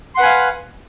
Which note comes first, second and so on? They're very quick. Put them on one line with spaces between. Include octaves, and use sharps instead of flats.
C6 F#5 B4 G#5 F5